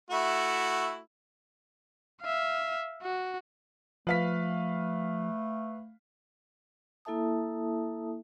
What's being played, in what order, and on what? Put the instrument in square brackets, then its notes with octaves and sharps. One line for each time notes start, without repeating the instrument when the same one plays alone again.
[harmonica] A3 E4 F#4
[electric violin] E5 F5
F#4
[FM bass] F3 [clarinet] A3 [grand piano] B4 F5 B6
[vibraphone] A#3 E4 A4 E5 A5 D#6